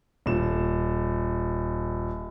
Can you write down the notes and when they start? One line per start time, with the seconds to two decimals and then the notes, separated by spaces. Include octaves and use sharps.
0.26 D#1 E7